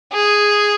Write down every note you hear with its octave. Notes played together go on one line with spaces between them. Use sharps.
G#4